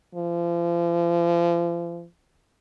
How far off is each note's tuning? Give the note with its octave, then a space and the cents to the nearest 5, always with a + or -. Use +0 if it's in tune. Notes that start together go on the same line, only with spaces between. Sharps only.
F3 -35